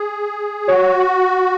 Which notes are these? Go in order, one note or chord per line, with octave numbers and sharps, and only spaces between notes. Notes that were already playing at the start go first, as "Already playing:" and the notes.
Already playing: G#4
F#4 C#5